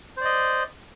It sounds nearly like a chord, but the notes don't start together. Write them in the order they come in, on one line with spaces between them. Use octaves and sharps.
C5 D5 D#5